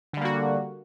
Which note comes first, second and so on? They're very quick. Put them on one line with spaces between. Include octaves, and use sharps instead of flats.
D3 G3 A#3 F#4